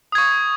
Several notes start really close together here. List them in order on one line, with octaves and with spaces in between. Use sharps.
D#6 G#6 C#6